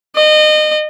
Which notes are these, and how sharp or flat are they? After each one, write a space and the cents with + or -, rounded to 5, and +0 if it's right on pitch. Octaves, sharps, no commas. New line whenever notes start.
D#5 -30